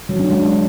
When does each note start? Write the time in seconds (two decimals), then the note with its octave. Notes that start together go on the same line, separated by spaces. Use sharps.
0.09 F#3
0.19 D4
0.30 G#3